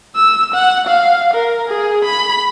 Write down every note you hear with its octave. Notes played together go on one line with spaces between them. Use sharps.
E6
F#5
F5
A#4
G#4
B5